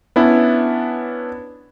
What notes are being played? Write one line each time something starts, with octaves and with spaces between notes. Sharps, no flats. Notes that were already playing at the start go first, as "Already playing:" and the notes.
B3 C#4 D4 E4